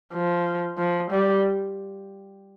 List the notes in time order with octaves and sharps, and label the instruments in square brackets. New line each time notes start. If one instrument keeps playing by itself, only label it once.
[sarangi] F3
F3
G3